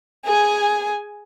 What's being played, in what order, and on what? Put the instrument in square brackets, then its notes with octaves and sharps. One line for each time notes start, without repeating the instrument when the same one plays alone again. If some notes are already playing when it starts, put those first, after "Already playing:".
[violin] G#4 G#5